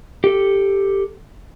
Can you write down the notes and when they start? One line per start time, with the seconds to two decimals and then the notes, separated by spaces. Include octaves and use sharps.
0.24 G4 A4